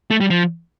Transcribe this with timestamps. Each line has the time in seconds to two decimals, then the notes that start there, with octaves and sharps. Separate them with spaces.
0.11 A3
0.21 G3
0.30 F3